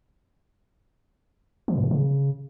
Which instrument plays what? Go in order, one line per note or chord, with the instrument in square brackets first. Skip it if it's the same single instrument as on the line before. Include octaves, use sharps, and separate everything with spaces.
[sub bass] E3
G#2
A2
C#3